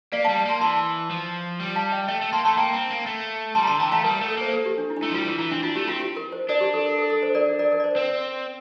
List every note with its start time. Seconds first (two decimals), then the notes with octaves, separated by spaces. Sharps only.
0.12 A#3 D5 F5
0.24 F5 A5
0.29 G3
0.45 A#3 A5 C6
0.61 E3 A5 C6
1.10 F3
1.60 G3
1.76 F5 A5
1.92 E5 G5
2.08 A3 E5 G5
2.21 A3
2.33 A#3 A5 C6
2.45 A3 A5 C6
2.57 A#3 G5 A#5
2.74 C4
2.90 A#3
3.06 A3
3.55 G3 A5 C6
3.63 A#5
3.67 D3 A5 C6
3.80 E3 G5 A#5
3.91 A3 F5 A5
4.04 G3 A#4
4.21 A3
4.28 A4
4.37 A#3 C5
4.53 A4
4.66 G4
4.78 D4
4.90 E4
4.97 D4
5.02 A3 E4
5.10 F3
5.14 G3 F4
5.27 E3
5.39 E3 E4
5.51 C4 D4
5.63 D4 F4
5.75 A3 G4
5.87 C4 F4
6.00 G4
6.16 A#4
6.32 C5
6.49 D4 A#4 D5
6.61 G4
6.74 A4
6.86 A#4
6.99 A4
7.10 A4
7.23 C5
7.35 A#4 D5
7.59 A#4 D5
7.72 A#4
7.80 D5
7.84 C5
7.96 C4 C5